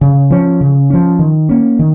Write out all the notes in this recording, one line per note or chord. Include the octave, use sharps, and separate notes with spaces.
C#3
F3 C#4
C#3
F3 C#4
D#3
A#3 C#4
D#3